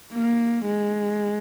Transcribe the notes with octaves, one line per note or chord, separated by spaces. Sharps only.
A#3
G#3